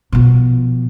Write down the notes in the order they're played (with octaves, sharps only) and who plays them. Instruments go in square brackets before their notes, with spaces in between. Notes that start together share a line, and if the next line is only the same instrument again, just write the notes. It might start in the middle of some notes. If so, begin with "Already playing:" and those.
[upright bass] B2 F3